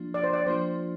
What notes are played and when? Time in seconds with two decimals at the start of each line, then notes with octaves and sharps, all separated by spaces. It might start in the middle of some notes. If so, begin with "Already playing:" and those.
Already playing: F3 A#3 D4 F4
0.14 D5
0.24 C5
0.33 D5
0.46 F3 A#3 D4 F4 C5